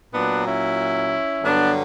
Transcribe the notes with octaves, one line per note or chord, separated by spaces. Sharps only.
A#2 F#3 B3 D4
C#4 E4
G2 D3 F#3 B3 D4